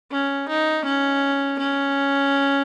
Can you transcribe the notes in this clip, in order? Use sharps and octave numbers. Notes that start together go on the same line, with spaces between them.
C#4
D#4
C#4
C#4